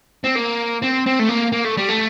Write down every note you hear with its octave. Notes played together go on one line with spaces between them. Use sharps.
C4
A#3
C4
C4
A3
A#3
A#3
A3
G3
A3